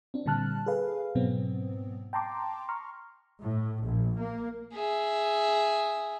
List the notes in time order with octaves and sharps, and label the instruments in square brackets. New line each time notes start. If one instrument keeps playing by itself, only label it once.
[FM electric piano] C4 D4
A#2 D3 G3 A5 F6 F#6
G#4 A4 B4 F5
G#2 B2 F#3 B3 C4
G5 A5 A#5 C6 D6
A#5 C6 C#6 F6
[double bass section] A2
A#1
A#3
[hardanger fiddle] G#4 E5